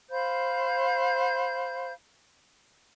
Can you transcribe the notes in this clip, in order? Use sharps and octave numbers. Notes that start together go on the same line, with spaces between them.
C5 F5 B5 G6